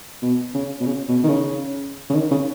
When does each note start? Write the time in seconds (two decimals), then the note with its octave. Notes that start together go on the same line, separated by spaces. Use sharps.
0.22 B2
0.54 C#3
0.80 B2
0.86 C#3
1.08 B2
1.24 D#3
1.29 C#3
2.10 C#3
2.15 D#3
2.31 C#3